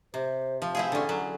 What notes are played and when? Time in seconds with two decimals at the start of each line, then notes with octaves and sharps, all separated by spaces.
0.14 C3 C5
0.62 F3
0.75 C4 E4 G#4 F5
0.92 D3 C#4
1.09 F#3 A4